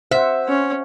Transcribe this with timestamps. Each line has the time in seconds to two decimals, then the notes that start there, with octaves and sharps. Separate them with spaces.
0.11 C5 E5 F#5
0.48 C#4